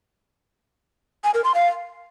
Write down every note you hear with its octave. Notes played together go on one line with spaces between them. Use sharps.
G#5
A#4
C6
F5